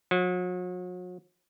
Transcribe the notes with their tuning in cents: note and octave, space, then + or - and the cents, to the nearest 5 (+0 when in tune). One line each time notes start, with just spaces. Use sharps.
F#3 -40